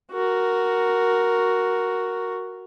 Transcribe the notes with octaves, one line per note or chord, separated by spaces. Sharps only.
F#4 A#4